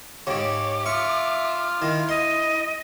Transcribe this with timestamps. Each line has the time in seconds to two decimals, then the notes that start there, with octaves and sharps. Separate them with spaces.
0.27 G#2 C#3 G4 C#5 D6
0.86 F4 E5 C#6
1.82 D#3 E4
2.09 D#5 C6